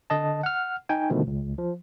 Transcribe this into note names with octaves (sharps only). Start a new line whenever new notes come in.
D3 D#5 A5
F#5 F6
D#4 G5 G#5
B2 D3 D#3 F3 A3
C#2
F3